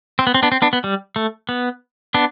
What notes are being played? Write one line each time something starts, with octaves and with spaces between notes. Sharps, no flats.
C4
B3
C4
B3 D4
C4
B3 D4
B3
G3
A3
B3
B3 D4